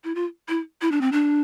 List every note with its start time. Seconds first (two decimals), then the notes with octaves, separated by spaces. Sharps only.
0.04 E4
0.15 F4
0.49 E4
0.82 E4
0.91 D4
1.01 C4
1.12 D4